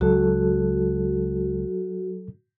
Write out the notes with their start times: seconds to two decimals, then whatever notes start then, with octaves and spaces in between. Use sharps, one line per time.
0.01 C#2 F#3 F#4 A4